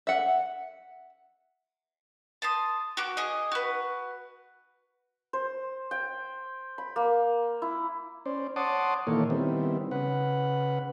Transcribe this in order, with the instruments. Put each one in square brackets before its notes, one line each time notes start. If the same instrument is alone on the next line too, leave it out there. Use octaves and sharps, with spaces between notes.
[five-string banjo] E5 F#5
[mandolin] A5 C6 D#6
F#4 D6
G#4 D#5
F#4 B4
[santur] C5
G5
B5
A#3
E4
[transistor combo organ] C#4 C5 D5
C#5 F#5 A5 C6 D6 D#6
A#2 D#3 E3 A#3 A4 C#5
D#3 G3 B3 C4 E4
C#3 B4 F#5